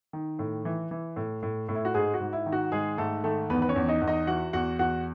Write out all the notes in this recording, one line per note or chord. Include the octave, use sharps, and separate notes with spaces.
D#3
A2
E3
E3
A2
A2
A2
E4
F#4
G#2 G#3 G#4
F#4
G#2
E4
D#3
F#4
G#2 G#3 G#4
G#2 A3 A4
D#3 A3 A4
E2 B3 B4
B4
C#4 C#5
E2
D#4 D#5
E2
D#4 D#5
E3 F#4 F#5
E2 F#4 F#5
E2 F#4 F#5